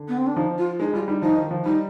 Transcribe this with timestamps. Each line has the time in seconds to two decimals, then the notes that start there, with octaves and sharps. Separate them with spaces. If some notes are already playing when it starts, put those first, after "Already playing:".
Already playing: D3
0.08 B3
0.17 C4
0.27 D4
0.36 F3 D#4
0.58 F4
0.80 G#3 D#4
0.93 G3 F4
1.08 G3 D#4
1.22 F3 D#4
1.37 D#3
1.51 F3
1.65 G3 D#4